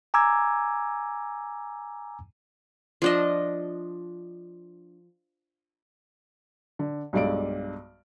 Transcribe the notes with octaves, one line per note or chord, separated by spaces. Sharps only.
G#5 A#5 D6 E6 G#6
F3 D4 D#5
D3
B1 G2 G#3 D5 D#5 D7